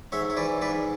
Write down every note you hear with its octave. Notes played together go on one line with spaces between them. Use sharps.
G#2 C#5 E5
C#5
E3 B4 D5
G#2 B4 D5